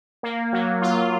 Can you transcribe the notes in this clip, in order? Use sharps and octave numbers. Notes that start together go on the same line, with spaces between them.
A#3
F#3
F4